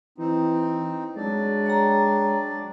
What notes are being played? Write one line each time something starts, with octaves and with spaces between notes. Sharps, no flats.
E3 C4 D#4
F#3 G#3 D4 D5
C#5 G5 A#5